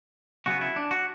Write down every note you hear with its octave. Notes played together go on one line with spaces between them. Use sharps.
C#3 F#3 B3 F#4
E4
D4
F#4